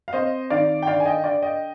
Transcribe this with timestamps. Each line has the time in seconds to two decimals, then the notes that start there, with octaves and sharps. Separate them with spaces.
0.08 F5
0.13 C4 C5 D#5
0.50 D#3 D5 F5
0.82 G5
0.87 D3 D5 F5
1.00 G#5
1.05 D#5 G5
1.24 D3 D5 F5
1.42 D#5 G5